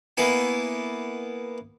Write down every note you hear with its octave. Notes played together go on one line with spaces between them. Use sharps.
A#3 B3 E4 G#5